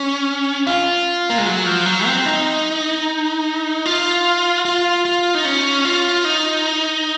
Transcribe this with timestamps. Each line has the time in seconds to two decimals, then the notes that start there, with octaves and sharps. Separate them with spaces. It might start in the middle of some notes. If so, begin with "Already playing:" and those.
Already playing: C#4
0.67 F4
1.30 A#3
1.38 G#3
1.46 F#3
1.66 F3
1.86 F#3
2.06 C4
2.25 D#4
3.86 F4
4.65 F4
5.05 F4
5.35 D#4
5.45 C#4
5.85 F4
6.25 D#4